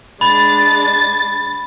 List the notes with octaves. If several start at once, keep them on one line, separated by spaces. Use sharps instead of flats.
G#3 D4 B5 A6